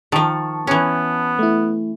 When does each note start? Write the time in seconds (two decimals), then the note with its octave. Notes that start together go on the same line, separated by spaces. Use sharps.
0.12 D#3 F3 A5 C#6
0.67 E3 B3 C#4
1.39 A3 E4